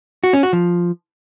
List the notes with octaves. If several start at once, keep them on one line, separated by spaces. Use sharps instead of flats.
F#4
C#4
F#4
F3